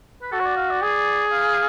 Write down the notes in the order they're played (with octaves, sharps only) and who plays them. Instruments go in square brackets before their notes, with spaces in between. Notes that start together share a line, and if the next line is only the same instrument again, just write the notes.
[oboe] B4
[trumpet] F#4 [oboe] A4
[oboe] C#5
D5
F5
D5
[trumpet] G#4
[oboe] F5